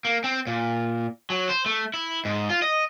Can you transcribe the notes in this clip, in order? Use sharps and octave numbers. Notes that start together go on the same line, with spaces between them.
A#3
C4
A#2
F#3
C5
A3
E4
G#2
F4
D#5